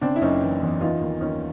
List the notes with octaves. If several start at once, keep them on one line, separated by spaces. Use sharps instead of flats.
C#3 C4 D4
E4
F#1 C#4 D#4
E3
E2
E3 D#4 F4
D#2
D#2 C#4 D#4